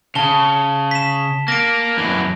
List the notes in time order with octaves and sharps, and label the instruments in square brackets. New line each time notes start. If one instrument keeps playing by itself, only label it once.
[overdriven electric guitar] C#3 [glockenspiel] A5 G7
[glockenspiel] B6 E7
[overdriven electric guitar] A#3 [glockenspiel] A#6 D7
[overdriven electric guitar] F#2 E3